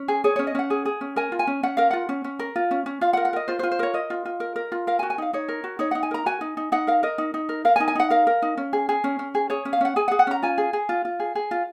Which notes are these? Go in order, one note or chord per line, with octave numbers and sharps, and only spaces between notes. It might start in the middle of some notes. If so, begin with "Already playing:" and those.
Already playing: C#4
G#4
G#4 C#5
C#4 C#5
D#5
C#4 F#5
G#4
G#4
C#4
A#4 G#5
F4
G#5
C#4
C#4 F#5
A#4 F5
F4 F#5
C#4
C#4
A#4
F4
C#4
C#4
F4 F5
F#5
A#4
F#5
A#4 D#5
F4 C5
C5
F4
C5
A#4 C#5
A#4 D#5
F4
F4
A#4
A#4
F4
A#4 F5
G#5
F#4
G#5
D#4 F5
D#4 C#5
A#4
F#4
D#4 C#5
D#4 F#5
G#5
A#4 A#5
F#4 G#5
D#4
D#4
D#4 F#5
A#4 F5
A#4 D#5
D#4
D#4
A#4
A#4 F5
G#5
D#4
G#5
D#4 F#5
A#4 F5
A#4
D#4
C#4
G#4
G#4
C#4
C#4
G#4
G#4 C#5
C#4
F5
C#4 F#5
G#4 G#5
F#5
G#4
F#5
C#4 A#5
F4 G#5
G#4
G#4
F4
F4
G#4
G#4
F4